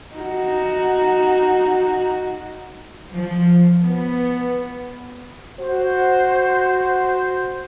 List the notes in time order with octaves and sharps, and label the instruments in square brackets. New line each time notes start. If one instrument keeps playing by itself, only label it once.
[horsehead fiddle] D#4 F#4
[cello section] F3
B3
[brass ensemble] F#4 C5